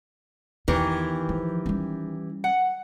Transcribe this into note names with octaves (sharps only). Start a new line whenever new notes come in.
E2 D#3 E3 G4
F3
G3 C#4
F#5